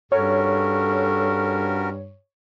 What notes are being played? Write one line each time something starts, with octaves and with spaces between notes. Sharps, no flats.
G2 C#4 F#4 A4 A#4 C#5